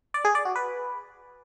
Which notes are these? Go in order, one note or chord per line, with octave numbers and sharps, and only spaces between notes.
D5
G#4
D5
F#4
B4